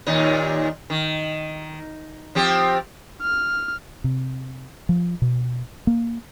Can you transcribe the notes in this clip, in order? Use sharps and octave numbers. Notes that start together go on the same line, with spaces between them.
D#2 A#2 D#4
D#3
F3 C4 G4
F6
C3
F3
B2
A#3